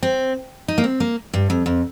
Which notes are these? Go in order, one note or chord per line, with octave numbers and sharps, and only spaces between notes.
C4
D#4
A#3
C4
A#3
G2
F2
F2